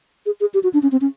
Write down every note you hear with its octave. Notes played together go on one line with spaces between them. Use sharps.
G#4
G#4
G4
F#4
D4
C#4
C4
C#4